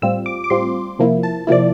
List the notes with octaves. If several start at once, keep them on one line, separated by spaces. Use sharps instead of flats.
A2 G3 C4 F4 E6
D6
D6
A2 G3 C4 F4 C6
C3 F3 A#3 E4
A5
C3 F3 A#3 E4 D5